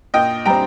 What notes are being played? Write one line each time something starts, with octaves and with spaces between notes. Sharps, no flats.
A#2 D#5 G5
G3 C4 G5 A#5